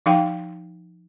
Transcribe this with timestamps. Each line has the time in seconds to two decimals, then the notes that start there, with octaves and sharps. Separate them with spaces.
0.06 F3 D#4 F5 G5